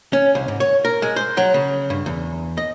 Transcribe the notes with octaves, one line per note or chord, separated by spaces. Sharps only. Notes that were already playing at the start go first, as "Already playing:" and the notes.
C#4
C2
G#2
C#5
A#4
G#3
C5
F#3
C#3
G2
E2
D#5